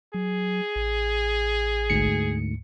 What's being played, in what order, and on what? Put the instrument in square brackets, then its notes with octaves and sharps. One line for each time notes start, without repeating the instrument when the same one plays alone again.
[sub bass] F#3 [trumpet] G#4
[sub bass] A1
[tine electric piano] D2 G#2 C#7